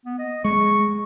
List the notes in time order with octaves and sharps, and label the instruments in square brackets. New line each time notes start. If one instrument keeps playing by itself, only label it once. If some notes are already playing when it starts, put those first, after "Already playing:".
[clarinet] B3
D#5
[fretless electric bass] G#3 [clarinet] C#6